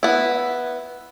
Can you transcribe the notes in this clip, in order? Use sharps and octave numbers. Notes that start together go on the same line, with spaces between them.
B3 E4